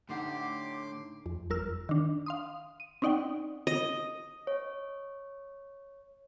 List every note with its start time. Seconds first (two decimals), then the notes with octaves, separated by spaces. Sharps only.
0.09 A2 D3 D#4 G4 F#5 C6 D6
1.26 F2
1.50 G1 F2 A#4 E6 F6
1.89 D#3 D4
2.26 F5 C6 D#6
2.80 D#7
3.02 C4 C#4 D#4 D5 F#5 G5
3.67 D#5
4.47 C#5